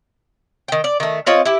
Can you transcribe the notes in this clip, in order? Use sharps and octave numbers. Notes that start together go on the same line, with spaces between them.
D#3 G5
D5
D#3 A3
C4 F4 C#5 D#5
E4 G4